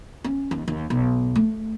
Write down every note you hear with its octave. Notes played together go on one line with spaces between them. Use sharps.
C#4
D#2
D#2
B1
A3